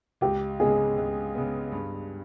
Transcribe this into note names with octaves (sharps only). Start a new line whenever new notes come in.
C#2 G4
C#3 G#3 B3 G#4
C#2
C#3 G#3 B3
G2